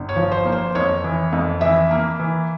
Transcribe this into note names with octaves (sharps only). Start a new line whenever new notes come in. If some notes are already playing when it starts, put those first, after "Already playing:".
Already playing: G1
C#5
F3
C5
A#3
C5
F2 C#5
E3
F2
E3 E5
A#3
E3